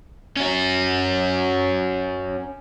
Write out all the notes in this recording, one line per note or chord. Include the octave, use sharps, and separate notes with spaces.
C#4 F#4